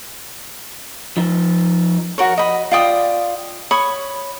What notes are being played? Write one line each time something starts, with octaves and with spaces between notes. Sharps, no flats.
F3 D#4
F#4 A#4 C#5
D#5 B5
F4 D5 G5 D#6
C#5 B5 C#6 D#6